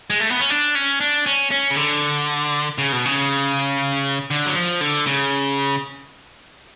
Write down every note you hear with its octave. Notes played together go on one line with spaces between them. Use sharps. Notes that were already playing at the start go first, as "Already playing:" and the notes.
G#3
A3
B3
C#4
D4
C#4
D4
C#4
C#4
C#3
D3
C#3
B2
C#3
D3
F#3
F3
D3
C#3